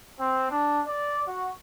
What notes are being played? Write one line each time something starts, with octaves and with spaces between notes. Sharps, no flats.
C4
D4
D5
F#4